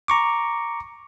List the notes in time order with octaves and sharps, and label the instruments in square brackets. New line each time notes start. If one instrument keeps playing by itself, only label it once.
[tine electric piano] A#5 C#6 D6